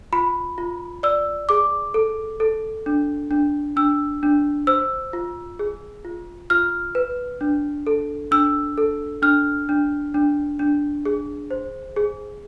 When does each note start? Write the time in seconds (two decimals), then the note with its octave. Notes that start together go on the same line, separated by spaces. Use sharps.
0.13 F4 B5
0.58 F4
1.03 D5 E6
1.49 G#4 D6
1.94 A4
2.40 A4
2.86 D4
3.31 D4
3.76 D4 E6
4.23 D4
4.67 C5 E6
5.13 F4
5.59 G#4
6.05 F4
6.50 F4 F6
6.95 B4
7.41 D4
7.87 A4
8.31 D4 E6
8.78 A4
9.22 D4 F6
9.69 D4
10.14 D4
10.59 D4
11.05 G#4
11.51 C5
11.96 G#4